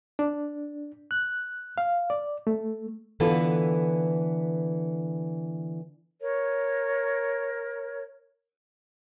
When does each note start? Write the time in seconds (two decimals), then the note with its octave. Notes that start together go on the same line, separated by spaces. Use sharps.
0.19 D4
1.11 F#6
1.78 F5
2.10 D5
2.47 A3
3.20 D3 E3 B3 F4 A4 B4
6.21 A#4 C#5